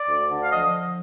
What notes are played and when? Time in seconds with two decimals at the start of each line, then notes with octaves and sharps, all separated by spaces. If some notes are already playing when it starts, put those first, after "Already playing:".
Already playing: D5
0.08 D2
0.30 D3
0.43 F5
0.52 F3 D#5